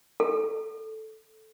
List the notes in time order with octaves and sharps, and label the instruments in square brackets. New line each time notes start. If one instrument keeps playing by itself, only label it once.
[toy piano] A4